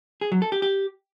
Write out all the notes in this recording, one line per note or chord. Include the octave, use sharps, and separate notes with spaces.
G#4
F#3
A4
G4
G4